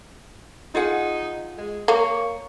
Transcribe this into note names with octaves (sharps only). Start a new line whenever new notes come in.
D#4 F4 G#4 F#5
G#3
A#3 C#5